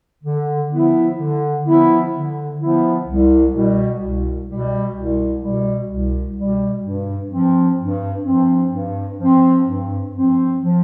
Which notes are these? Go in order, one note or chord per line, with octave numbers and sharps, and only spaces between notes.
D3
F3 B3 E4
D3
F3 B3 E4
D3
F3 B3 E4
C2
B2 G3
C2
B2 G3
C2
B2 G3
C2
B2 G3
G2
F3 C4
G2
F3 C4
G2
F3 C4
G2
F3 C4
F3